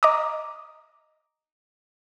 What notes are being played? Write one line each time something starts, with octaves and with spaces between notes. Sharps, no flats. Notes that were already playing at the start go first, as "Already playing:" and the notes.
D#5 A#5 D6 D#6